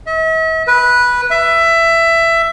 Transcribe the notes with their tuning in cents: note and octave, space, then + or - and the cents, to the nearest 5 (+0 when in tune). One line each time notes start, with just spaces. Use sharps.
E5 -45
B4 -10
E5 +15